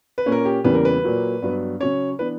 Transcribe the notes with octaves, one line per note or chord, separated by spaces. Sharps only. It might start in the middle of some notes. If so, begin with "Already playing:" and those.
B4
A#2 A#3 C#4
A#4
G4
E2 C#3 E3 G3 A#3 B4
A#4
B4
A#2 F#3 A#3
G2 F#3 B3
C#3 F#3 C#4 C#5
E3 B3 D4 B4